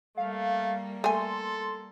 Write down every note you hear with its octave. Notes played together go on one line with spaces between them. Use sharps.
G3 A3 A#3 F5
A3 A4 G#5 C6